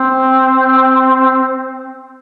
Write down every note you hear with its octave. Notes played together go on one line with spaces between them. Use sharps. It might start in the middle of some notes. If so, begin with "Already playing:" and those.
Already playing: C4